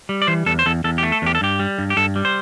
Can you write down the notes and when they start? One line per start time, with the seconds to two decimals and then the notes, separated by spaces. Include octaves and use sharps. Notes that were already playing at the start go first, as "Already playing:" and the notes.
0.09 G3
0.22 D5
0.27 E3 C5
0.46 E2 A4
0.59 C5
0.66 E2 A4
0.84 E2 A4
0.98 G4
1.03 A3
1.12 A4
1.22 E2 G4
1.35 A4
1.41 G2 G4
1.59 G3
1.78 G2
1.90 G4
1.97 G2 A4
2.16 G3
2.25 C5